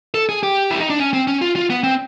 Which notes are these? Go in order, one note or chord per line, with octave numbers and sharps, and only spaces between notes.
A4
G#4
G4
E4
D#4
D4
C#4
C4
C#4
F4
F4
B3
C4